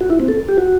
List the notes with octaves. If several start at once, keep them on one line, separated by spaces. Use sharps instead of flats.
F#4
E4
C4
A4
G4
F#4